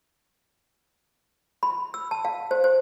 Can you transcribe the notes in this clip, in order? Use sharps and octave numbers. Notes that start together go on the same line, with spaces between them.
B5
E6
A5
F5
C5
C5